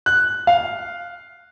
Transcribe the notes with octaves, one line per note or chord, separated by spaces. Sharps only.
F#6
F5